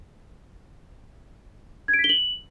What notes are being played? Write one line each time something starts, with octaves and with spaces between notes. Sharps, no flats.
G#6
D7
B6
G7
F#7